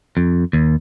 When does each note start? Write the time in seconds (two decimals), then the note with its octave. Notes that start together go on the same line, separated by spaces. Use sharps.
0.17 F2
0.53 D#2